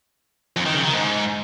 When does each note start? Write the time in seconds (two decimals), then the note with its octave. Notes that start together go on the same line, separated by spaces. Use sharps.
0.56 F2
0.66 D#3
0.75 C#3
0.84 D#3
0.93 G#2